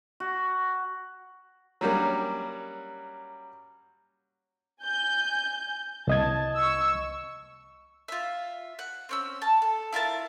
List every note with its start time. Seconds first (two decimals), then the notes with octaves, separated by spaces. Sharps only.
0.20 F#4
1.81 F#3 G3 A#3 C#4
4.83 G#5 G6
6.07 C2 D#5 A5 G#6
6.55 C#6 E6
8.08 F4 E5
8.79 F#5
9.09 C4 C#4 E6
9.42 A5
9.62 A4
9.92 E4 F4 A#4 A5